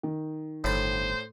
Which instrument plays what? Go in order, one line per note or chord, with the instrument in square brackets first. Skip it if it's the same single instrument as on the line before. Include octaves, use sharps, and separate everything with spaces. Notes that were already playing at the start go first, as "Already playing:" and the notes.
[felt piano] D#3
[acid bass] G1 [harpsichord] A2 B5 [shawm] C5